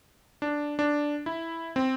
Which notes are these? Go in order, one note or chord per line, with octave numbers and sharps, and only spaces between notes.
D4
D4
E4
C4